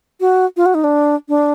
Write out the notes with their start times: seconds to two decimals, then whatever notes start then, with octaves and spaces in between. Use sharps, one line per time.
0.21 F#4
0.57 F4
0.66 F#4
0.75 D#4
0.84 D4
1.29 D4